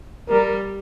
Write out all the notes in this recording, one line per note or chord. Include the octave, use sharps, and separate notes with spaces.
G3 A#4